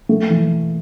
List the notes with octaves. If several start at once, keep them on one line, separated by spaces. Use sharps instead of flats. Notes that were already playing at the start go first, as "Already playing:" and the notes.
A3
E3